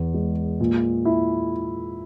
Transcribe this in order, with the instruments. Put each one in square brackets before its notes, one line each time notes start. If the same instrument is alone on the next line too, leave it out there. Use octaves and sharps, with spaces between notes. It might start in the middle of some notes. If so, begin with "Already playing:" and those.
Already playing: [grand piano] E2
G#3
A#2
E4